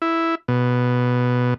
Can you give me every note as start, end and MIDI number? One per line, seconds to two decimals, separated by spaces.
0.02 0.35 64
0.48 1.54 47